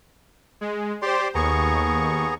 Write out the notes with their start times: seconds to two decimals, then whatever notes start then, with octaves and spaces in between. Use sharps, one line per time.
0.61 G#3
1.02 G4 C5 D5 C6
1.35 D#2 B3 G#4 A#5 C#6